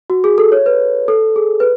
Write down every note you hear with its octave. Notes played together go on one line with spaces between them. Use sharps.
F#4
G#4
A4
C#5
B4
A4
G#4
B4